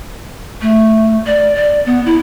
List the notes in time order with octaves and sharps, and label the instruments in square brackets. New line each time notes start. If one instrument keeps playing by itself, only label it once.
[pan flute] A3
D5
D5
B3
E4